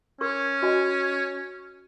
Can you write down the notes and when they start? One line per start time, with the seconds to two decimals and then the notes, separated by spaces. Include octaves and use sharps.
0.21 C#4 A#4 C#6
0.62 F#4 D#5 G#5